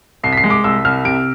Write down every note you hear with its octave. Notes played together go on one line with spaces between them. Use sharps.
C2 C7
B6
C7
G#3
D6
C2 E6
C2 F6
C3 D7